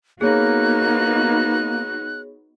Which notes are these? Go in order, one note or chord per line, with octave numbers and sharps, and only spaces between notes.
A#3 B3 D#4 F#4 G#4 C#5 F#6